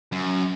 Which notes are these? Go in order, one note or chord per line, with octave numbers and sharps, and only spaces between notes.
F#2